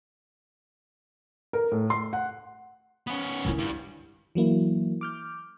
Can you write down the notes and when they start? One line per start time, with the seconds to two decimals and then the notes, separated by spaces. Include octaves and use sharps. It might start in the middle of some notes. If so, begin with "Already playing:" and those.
1.53 A#4
1.71 A2
1.90 C6
2.13 F#5
3.07 B3 C#4
3.45 D#3 E4
3.58 G2 G3
4.35 E3 F#3 A#3 E4
5.01 D6 F6 G6